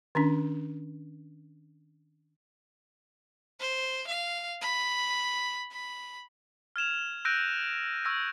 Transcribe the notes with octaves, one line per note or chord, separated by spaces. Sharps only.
D#3 C#4 D4
C5
F5
B5
B5
F6 G#6 E7 F7
E6 F#6 G6 A#6 D7 D#7
C#6 E6 G#6 A#6